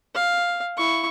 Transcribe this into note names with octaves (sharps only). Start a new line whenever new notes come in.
F5
E4 C#6